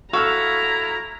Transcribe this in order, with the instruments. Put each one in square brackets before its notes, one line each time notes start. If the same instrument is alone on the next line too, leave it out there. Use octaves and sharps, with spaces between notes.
[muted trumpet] E4 [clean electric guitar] F#4 A4 F5 [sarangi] A#5 [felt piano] C#6 E6 F6